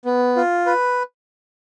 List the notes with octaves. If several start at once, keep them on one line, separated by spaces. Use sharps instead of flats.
B3
F4
B4